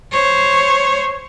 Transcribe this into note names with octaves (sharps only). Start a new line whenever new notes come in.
C5 C#5